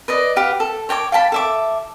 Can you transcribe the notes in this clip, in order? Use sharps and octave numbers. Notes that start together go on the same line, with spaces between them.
B4 D5 D#5
G4 B4 F5 F#5
A4
C#5 G5 A5 D6
F5 G5 A5 B5
A4 E5 D6